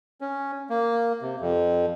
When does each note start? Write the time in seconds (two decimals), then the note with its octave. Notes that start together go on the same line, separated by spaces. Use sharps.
0.21 C#4
0.70 A#3
1.22 C3
1.40 F2